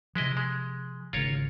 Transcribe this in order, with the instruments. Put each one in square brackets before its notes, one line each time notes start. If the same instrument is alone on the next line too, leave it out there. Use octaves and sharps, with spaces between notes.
[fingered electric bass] C3 F3 [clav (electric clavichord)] G#3 E4 D#5
[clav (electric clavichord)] G#3
[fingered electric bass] G#1 C#3 [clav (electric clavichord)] F4 A#4 C#5